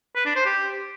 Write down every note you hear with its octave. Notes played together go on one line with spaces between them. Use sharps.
B4
D4
C5
G4